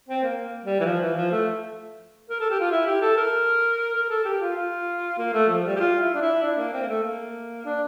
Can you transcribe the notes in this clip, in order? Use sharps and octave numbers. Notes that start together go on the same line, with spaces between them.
C4
A#3
G3
E3
F3
E3
F3
A3
A#4
A4
G4
F4
E4
G4
A4
A#4
A#4
A4
G4
F4
F4
A#3
A3
F3
G3
G4
F4
E4
D4
E4
D4
A#3
C4
A#3
A3
A#3
D4